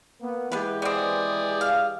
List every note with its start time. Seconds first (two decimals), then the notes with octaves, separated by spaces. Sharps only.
0.21 A#3 B3
0.52 E3 G#3 B3 G4 B4
0.82 B3 C4 G#4 D5
1.61 F5